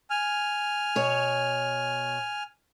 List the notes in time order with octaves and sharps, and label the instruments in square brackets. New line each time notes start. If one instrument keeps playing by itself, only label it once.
[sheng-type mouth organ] G#5 F6
[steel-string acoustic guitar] B2 C#5